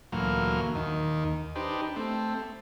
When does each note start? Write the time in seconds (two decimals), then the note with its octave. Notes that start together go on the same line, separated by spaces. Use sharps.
0.12 D2 A#2 E3 F#3 A#3 F6
0.75 D#2 D#3
1.55 D4 D#4 G4 B4 C5
1.96 A3 C4